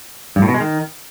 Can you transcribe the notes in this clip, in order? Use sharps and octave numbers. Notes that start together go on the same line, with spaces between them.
G2
A2
B2
G#3
D#3